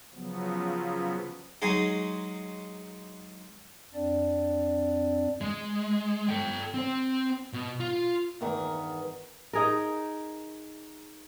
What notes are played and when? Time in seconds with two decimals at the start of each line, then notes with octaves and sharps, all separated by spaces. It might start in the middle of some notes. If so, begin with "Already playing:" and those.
0.14 C#3 F3 F#3 B3
1.62 F#3 G#3 D#4 G#4
3.94 F2 C4 D4 D5
5.41 G#3
6.28 A4 G5
6.74 C4 C5
7.53 B2
7.80 F4
8.41 E2 G2 D#3 B3 G#4 A#4
9.53 D#4 G#4 A#4